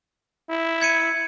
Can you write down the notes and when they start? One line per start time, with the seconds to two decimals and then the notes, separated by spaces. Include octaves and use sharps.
0.50 E4
0.81 G#6 C#7 D#7